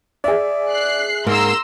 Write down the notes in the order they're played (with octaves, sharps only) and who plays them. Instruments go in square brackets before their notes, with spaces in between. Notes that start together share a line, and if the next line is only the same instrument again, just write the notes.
[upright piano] G#4 E5 [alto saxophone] D5
[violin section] F#6 C7
[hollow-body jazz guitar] G#2 A#3 [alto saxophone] A#4 [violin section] A#5 C6 E6